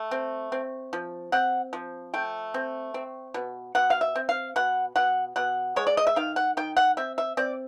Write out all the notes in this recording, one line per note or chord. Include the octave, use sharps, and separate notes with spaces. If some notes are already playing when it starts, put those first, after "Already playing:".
Already playing: A3
C4
C4
F3
C4 F#5
F3
A3 G5
C4
C4
B2
B2 F#5
F5
E5
C4
F5
B2 F#5
B2 F#5
B2 F#5
G#3 C#5
D5
D#5
E5
D#3 F5
F#5
D#3 G5
F#5
C4 E5
E5
C4 D5